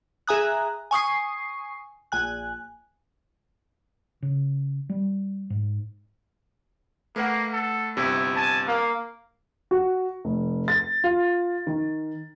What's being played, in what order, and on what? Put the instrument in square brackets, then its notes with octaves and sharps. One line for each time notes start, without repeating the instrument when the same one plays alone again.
[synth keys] G#4 E5 G#5 A#5 D#6 F#6
G#5 C#6 D#6 C7
A#1 G#5 F#6
[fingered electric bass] C#3
G3
G#2
[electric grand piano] A3 B4 F#5 [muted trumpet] A#3
[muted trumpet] A4
[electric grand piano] G1 C3 [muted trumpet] E4
[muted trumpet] G#5 [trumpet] A5
[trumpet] A#3 [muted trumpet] F5
[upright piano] F#4
F1
A6
F4
D#3